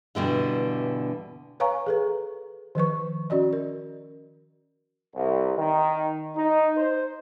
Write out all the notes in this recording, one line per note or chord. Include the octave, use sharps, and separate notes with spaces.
G2 B2 D3 E3
B4 C#5 F5 G#5 A#5 C#6
G#4 A4 B4
D#3 F3 B4 C#6
C#4 F#4 D5 D#5
A#4
C2
D#3
D#4
C5